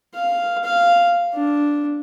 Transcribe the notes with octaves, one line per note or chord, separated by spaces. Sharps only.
F5
F5
D4